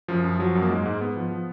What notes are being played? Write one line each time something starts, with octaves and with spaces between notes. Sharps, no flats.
F#2 F3
F#2
F3 F#3
F#2
A#3
G#2 G#3
G#2
G#2 B3
F3
F3